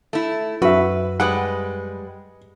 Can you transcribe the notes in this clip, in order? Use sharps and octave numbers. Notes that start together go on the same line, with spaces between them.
A3 E4
F#2 F#4 B4 E5
G3 G#3 B4 F#5